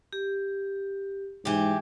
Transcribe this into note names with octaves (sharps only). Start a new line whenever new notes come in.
G4
G#2 E3 G4